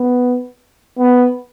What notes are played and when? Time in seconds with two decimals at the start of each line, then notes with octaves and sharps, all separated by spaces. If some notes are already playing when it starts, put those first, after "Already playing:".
Already playing: B3
0.98 B3